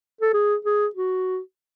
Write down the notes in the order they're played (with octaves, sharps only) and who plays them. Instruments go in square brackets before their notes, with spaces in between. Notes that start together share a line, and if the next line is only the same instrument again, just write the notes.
[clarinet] A4
G#4
G#4
F#4